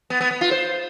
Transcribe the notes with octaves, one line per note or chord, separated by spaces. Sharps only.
B3
B3
B3
F4
C5